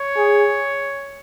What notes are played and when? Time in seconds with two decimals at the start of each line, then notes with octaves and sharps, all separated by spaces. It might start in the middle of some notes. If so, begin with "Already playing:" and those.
Already playing: C#5
0.17 G#4